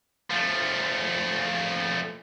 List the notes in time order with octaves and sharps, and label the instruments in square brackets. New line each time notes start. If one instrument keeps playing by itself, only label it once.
[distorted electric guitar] F3 A3